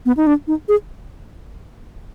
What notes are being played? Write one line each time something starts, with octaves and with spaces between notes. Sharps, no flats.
B3
D#4
D4
D#4
G#4